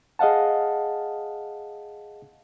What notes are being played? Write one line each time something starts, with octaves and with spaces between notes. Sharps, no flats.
G#4 D#5 F5 F#5 A5